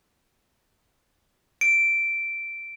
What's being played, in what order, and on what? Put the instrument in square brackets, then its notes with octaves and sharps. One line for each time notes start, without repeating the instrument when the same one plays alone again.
[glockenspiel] D7